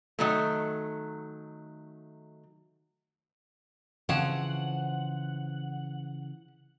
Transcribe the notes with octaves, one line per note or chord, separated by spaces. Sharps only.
D#3 F#3 A3
C#3 E3 F3 C4 C#5 F#5